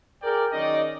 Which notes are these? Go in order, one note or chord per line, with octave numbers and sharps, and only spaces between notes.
G#4 A#4 D5 G5
D#3 F#3 C#4 D#4 D5 D#5